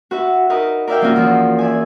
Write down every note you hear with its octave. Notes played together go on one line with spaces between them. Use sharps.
F#4 B4 E5
D#4 F#4 A#4 B4 D#5 F#5
A#4 B4 D5 E5 F5 G5
F3 A#3 C#4 F4 F#4 A#4
E2 F3
D5 E5 G#5